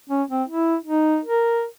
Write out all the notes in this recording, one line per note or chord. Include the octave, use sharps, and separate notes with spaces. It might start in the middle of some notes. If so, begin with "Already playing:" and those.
C#4
C4
E4
D#4
A#4